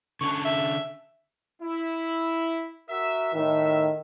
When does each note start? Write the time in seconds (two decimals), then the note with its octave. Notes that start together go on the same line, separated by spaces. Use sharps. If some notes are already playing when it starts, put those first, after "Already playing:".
0.21 D3 C#4 A5 C#6
0.45 E5
1.62 E4
2.90 F#4 A#4 E5
3.34 A2 D#3 E5